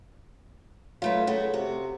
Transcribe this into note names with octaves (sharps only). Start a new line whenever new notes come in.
F#3 A3 F4 B4
C#3 A3 F#4
C3 F#4